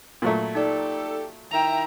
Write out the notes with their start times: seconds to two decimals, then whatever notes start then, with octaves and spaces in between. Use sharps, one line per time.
0.22 A#2 F#3 A3
0.55 D#4 G4 A4 D5
1.51 D#3 E4 E5 G5 A#5 F7